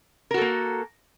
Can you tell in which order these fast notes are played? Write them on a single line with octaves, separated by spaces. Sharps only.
A#4 F#4 A4 A#3